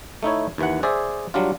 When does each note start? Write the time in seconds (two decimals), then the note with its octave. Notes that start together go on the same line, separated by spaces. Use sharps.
0.23 A3 D#4 E4 C#5
0.58 D#2 E3 F#5
0.83 G#4 C5 D5 E5
1.34 F#3 G3 D4 F4